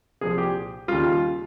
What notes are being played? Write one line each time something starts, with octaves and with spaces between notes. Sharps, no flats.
C2 A#2 F3 G#4
G4
D#2 C#3 G3 F4